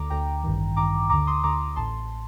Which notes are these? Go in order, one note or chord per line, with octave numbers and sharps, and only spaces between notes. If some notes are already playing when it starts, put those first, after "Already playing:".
Already playing: D2 D3 A#5 D6
D2 D3 G5 A#5
A1 G2 D#3
A1 G2 D#3 A#5 D6
D2 D3 A#5 D6
C6 D#6
D2 D3 A#5 D6
A1 A2 A5 C6